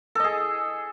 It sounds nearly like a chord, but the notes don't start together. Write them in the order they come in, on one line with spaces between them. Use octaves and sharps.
A4 D#5 G#4